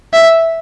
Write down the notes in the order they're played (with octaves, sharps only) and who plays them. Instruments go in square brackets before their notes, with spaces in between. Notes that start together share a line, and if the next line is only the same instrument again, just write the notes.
[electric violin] E5